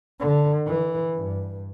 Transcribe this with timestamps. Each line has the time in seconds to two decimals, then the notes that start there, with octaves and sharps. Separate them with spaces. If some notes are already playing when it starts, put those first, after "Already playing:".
0.19 D3
0.66 E3
1.16 G2